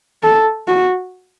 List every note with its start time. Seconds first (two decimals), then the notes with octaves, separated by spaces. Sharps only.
0.23 A4
0.68 F#4